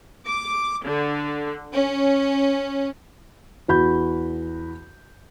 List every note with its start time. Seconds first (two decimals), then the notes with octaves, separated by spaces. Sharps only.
0.25 D6
0.84 D3
1.73 C#4
3.68 E2 F#4 B5 G6